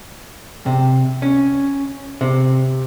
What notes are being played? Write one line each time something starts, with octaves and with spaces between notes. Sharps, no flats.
C3
C#4
C3